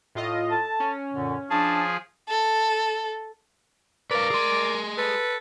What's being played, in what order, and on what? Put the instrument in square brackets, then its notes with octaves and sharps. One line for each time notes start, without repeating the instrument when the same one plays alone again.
[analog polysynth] A2 F4 D#5
[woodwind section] A4 A5
[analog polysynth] C#4
[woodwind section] F#2 A#2 D3
[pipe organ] F3 G#4 [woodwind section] D4 A5
[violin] A4
[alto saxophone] A#4 [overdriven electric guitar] B4 F5 [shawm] D5
[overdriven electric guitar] G#4 C6
[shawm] A4 [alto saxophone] B4